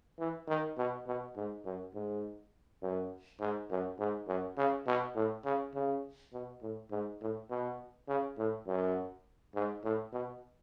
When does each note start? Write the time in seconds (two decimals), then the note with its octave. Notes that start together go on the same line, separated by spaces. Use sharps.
0.19 E3
0.48 D#3
0.78 B2
1.07 B2
1.36 G#2
1.65 F#2
1.94 G#2
2.82 F#2
3.40 G#2
3.70 F#2
3.99 G#2
4.28 F#2
4.57 C#3
4.87 B2
5.16 A2
5.45 C#3
5.74 C#3
6.33 B2
6.62 A2
6.91 G#2
7.21 A2
7.50 B2
8.08 C#3
8.38 A2
8.68 F#2
9.55 G#2
9.84 A2
10.13 B2